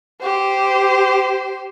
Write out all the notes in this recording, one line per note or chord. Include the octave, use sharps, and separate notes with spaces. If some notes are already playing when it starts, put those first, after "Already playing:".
G4 C5